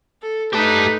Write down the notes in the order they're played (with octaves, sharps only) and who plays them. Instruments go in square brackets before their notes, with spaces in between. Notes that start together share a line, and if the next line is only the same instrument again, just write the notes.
[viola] A4
[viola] A3 D#4 [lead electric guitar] G4 A5 [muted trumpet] B4